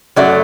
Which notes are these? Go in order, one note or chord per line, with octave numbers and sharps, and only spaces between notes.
F#2 F#3 A3 D5